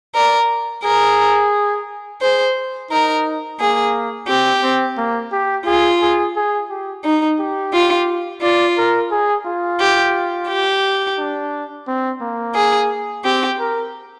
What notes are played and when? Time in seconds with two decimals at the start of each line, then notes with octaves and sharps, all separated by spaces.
0.15 A#4 D5
0.84 G#4 A#4
2.21 G#4 C5
2.91 D#4 A#4
3.60 A#3 G#4
4.28 C4 G4
4.63 C4
4.97 A#3
5.32 G4
5.66 F4 G#4
6.02 G#4
6.36 G#4
6.69 G4
7.04 D#4
7.39 G4
7.73 F4
8.42 F4 D5
8.77 A#4
9.11 G#4
9.46 F4
9.80 G4
10.49 G4
11.18 D4
11.87 C4
12.21 A#3
12.55 G#4
13.24 C4 G4
13.59 A#4